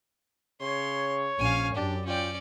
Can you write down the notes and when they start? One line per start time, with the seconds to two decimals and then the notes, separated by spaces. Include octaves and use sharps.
0.61 C#3 C#5 C6
1.39 A#1 C#4 F5 G#5
1.75 F#2 D4 G4 D5
2.05 C#4 F4 D5 G5